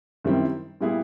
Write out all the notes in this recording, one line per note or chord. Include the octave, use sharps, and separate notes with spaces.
F#2 D#3 G3 C4 E4
A#2 G3 B3 E4 G#4